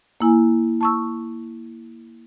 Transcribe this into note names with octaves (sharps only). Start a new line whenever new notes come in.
A#3 E4 G#5
A5 C#6 E6